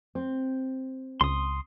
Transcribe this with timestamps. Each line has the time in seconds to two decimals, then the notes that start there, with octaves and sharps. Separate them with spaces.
0.15 C4
1.21 C#2 C6 D#6